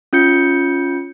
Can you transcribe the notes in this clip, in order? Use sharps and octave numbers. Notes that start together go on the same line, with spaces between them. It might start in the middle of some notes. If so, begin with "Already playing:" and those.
C#4 F4 G6 C#7